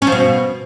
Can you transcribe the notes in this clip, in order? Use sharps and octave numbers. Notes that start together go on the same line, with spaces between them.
C#4
F3
B2